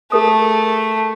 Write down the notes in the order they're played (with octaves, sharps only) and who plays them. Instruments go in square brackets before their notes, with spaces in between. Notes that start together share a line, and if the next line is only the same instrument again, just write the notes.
[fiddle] A3 [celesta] G#4 A#4 D#6